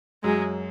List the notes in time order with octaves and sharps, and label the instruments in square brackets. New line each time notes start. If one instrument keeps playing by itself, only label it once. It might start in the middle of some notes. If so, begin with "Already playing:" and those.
[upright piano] F#2 F#3 [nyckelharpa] G#3